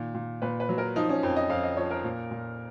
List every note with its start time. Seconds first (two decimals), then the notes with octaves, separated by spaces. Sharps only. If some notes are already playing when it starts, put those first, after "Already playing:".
Already playing: A#2 D#3
0.14 A#2
0.42 A#2 B4
0.60 B4
0.69 F#3
0.78 A#4
0.96 F3 D#4
1.09 C#4
1.23 F2
1.36 D#5
1.50 F2 F5
1.63 D#5
1.77 F3 C#5
1.91 A#4
2.04 A#2
2.31 A#2